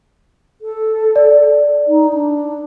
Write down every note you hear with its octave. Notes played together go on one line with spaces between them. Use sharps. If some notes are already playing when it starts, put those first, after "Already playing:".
A4
D5
D#4
D4